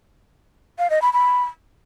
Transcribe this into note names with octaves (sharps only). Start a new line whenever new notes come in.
F5
D#5
B5
B5